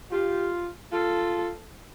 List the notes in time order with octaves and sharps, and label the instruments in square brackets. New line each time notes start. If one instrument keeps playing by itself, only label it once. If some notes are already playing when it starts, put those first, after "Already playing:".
[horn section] F4 [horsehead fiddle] G4
[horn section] F4 [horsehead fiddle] A4